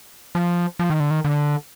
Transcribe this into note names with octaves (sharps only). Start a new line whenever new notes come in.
F3
F3
D#3
D3
D#3
D3